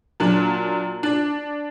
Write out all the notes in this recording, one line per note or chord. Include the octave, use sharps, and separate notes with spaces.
A#2 F#3 D4
D4